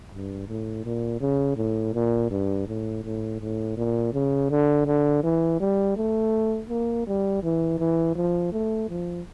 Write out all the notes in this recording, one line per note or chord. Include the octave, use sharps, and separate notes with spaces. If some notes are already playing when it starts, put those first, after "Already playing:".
G2
A2
A#2
C#3
A2
A#2
G2
A2
A2
A2
A#2
C#3
D3
D3
E3
G3
A3
A#3
G3
E3
E3
F3
A3
F3